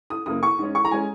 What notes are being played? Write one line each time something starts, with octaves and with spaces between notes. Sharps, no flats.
D#6
F#2 C#3 A#3 D#6
C#6
G#2 G#3 C#4
C#6
A#5
G#3 C#4 G#5